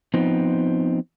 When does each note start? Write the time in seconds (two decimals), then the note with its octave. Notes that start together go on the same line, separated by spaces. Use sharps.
0.14 F3 B3 C4 D#4